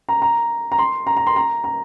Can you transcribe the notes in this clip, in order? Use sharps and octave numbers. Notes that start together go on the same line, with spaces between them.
A#5
A#5
A#5
C6
A#5
A#5
C6
A#5
A#5